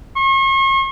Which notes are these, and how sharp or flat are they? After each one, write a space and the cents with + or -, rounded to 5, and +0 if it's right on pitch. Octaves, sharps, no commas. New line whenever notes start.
C#6 -40